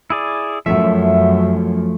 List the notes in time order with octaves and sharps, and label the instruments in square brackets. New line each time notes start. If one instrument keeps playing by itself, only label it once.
[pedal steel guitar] E4 G#4 D5
[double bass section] F#2 [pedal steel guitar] F3 A3 [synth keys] E5